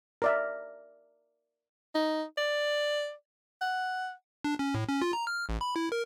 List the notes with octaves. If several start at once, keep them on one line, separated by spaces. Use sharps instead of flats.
A#4 D5 E5
D#4
D5
F#5
D4
C#4
A2
C#4
F4
A#5
F6
A1
B5
E4
A#4